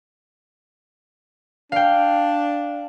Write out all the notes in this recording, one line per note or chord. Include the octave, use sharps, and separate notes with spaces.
D4 F5 G5